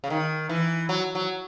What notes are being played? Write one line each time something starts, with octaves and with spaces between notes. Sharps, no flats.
C#3
D#3
E3
F#3
F#3